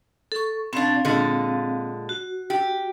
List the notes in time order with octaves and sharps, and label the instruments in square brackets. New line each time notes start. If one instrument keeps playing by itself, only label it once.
[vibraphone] A4 C#6
[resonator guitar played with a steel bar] B2 D4 [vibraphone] C4 F5
[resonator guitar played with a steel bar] A#2 D3 G#3
[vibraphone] F#4
[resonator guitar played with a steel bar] G4